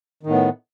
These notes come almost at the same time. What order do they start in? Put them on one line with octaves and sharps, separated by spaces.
D#3 A2 B3